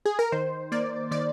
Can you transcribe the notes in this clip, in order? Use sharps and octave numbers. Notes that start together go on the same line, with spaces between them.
G#4
A#4
D#3 C5
A#3 D5
D#3 D5